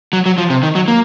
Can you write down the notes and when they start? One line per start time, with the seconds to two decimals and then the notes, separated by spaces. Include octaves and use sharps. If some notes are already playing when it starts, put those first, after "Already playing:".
0.13 F#3
0.26 F#3
0.38 F3
0.50 C3
0.63 D#3
0.75 F#3
0.88 A#3